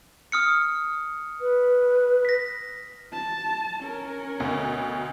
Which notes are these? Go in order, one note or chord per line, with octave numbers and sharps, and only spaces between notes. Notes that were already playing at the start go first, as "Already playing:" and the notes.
D#6 F6 C#7
B4
A#6 B6
A5
C#4 A#4
D2 B2